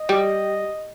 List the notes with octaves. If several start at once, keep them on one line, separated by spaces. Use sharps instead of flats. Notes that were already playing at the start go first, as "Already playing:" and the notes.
Already playing: D#5
G3